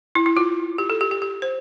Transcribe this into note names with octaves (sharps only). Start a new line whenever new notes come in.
E4
E4
F4
G4
A4
G4
G4
G4
C5